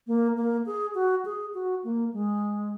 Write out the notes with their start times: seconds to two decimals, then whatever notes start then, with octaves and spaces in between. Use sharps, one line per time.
0.07 A#3
0.36 A#3
0.66 G#4
0.95 F#4
1.25 G#4
1.54 F#4
1.84 A#3
2.13 G#3